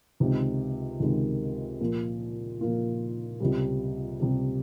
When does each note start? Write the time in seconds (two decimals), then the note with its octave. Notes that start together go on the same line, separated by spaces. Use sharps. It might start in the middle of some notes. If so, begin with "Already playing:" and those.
0.20 C#2 C3 D#3 G#3 D#4
1.00 C#2 C3 D#3 G#3 D#4
1.81 A#2 F3 A#3 F4
2.61 A#2 F3 A#3 F4
3.40 C#2 C3 G3
4.20 C#2 C3 G3